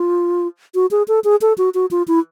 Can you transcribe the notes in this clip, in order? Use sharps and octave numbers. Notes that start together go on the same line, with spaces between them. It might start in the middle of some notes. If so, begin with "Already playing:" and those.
Already playing: F4
F#4
G#4
A4
G#4
A4
F#4
F#4
F4
E4